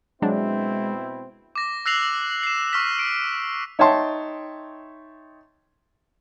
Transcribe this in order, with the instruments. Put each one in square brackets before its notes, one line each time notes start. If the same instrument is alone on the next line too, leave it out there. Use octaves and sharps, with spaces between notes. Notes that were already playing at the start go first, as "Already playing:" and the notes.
[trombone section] B2 C4 E4 [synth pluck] F#3 D4 [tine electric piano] G#3
[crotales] D6 A#6
E6 F#6 A#6 C7 F7 F#7
C7 E7
C#6 F6 B6
D7
[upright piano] D#4 C#5 E5 G5 A5 C6